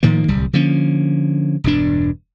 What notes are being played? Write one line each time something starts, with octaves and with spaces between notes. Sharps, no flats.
A2 D#3 F3 A#3
D1 C2 G3
D3 F3 A#3 C#4
E1 G2 D4